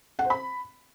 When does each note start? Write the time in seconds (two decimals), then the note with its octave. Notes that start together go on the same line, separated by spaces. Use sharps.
0.19 F#5
0.24 C5
0.30 B5